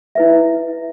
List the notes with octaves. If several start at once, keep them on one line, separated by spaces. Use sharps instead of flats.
E4 B4 E5